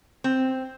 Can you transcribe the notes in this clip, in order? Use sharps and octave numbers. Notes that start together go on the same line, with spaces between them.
C4